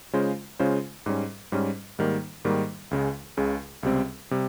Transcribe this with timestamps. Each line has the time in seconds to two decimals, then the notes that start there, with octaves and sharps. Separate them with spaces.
0.13 C#3 G#3 C#4 F4 C5
0.59 C#3 G#3 C#4 F4 C5
1.06 G#2 G3 C#4
1.52 G#2 G3 C#4
1.99 G#2 D#3 G3 A#3
2.45 G#2 D#3 G3 A#3
2.91 C#2 C#3 G#3
3.37 C#2 C#3 G#3
3.83 C#2 C3 G3 C4
4.31 C3 G3